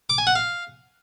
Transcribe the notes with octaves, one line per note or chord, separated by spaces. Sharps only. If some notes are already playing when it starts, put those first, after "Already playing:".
D6
G#5
F#5
F5